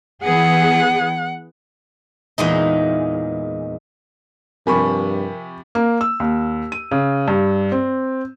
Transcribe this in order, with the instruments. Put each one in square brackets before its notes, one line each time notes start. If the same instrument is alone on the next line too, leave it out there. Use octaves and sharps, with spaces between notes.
[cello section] E3 B3 G#4 [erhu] F#5
[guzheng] E2 A#2 G#3 D#4
[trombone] G2 [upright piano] C3 F3 [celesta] A#4 [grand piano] G#5 B5 C#6
[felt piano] A#3
E6
D#2
D#7
C#3
G2
C4